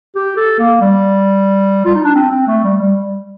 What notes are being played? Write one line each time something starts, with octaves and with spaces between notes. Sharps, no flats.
G4
A4
A#3
G3
F4
D#4
D4
C4
C4
A3
G3
G3